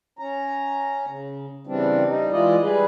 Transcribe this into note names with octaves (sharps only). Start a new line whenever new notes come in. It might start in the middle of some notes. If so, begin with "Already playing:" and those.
C#4 A#5
C#3
C#3 E3 G3 C4 D4
G3 D#4
E3 G#3 E4 F4 D5 D#5
G3 G#4 B4